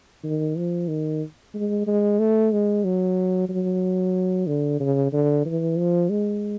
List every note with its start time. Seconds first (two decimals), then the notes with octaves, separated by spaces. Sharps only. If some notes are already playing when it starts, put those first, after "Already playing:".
0.24 D#3
0.57 F3
0.88 D#3
1.54 G#3
1.87 G#3
2.19 A3
2.52 G#3
2.85 F#3
3.49 F#3
4.47 D3
4.80 C#3
5.12 D3
5.45 E3
5.78 F3
6.10 G#3